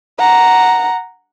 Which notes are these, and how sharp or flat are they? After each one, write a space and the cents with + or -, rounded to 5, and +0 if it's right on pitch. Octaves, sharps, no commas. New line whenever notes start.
F#5 +0 A#5 +0